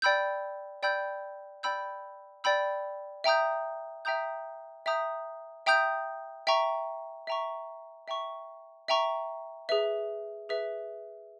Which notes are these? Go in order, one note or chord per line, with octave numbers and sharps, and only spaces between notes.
D5 G5 B5 E6 G6
D5 G5 B5 E6 G6
D5 G5 B5 E6 G6
D5 G5 B5 E6 G6
E5 G5 A#5 D#6 G6
E5 G5 A#5 D#6 G6
E5 G5 A#5 D#6 G6
E5 G5 A#5 D#6 G6
E5 G5 A#5 C#6
E5 G5 A#5 C#6
E5 G5 A#5 C#6
E5 G5 A#5 C#6
G#4 B4 E5
G#4 B4 E5